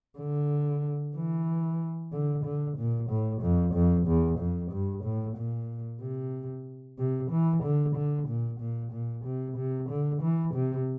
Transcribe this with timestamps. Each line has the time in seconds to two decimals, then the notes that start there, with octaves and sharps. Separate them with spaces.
0.19 D3
1.16 E3
2.13 D3
2.45 D3
2.77 A#2
3.10 A2
3.42 F2
3.74 F2
4.07 E2
4.39 F2
4.72 G2
5.04 A2
5.37 A#2
6.01 C3
6.98 C3
7.31 E3
7.63 D3
7.96 D3
8.28 A#2
8.60 A#2
8.92 A#2
9.25 C3
9.57 C3
9.89 D3
10.22 E3
10.54 C3